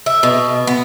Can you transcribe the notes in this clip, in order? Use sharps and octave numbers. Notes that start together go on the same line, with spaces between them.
E5
B2
B3